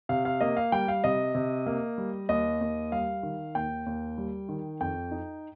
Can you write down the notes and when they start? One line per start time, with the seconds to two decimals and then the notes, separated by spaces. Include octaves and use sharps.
0.09 C3 F5
0.25 F5
0.41 A#3 D#5
0.57 F5
0.72 G3 G5
0.88 F5
1.04 C3 D#5
1.35 C3
1.66 A#3
1.98 G3
2.29 D#2 D#5
2.61 D#2
2.92 G3 F5
3.23 D#3
3.55 D#2 G5
3.86 D#2
4.18 G3
4.49 D#3
4.81 F2 G5
5.11 D#4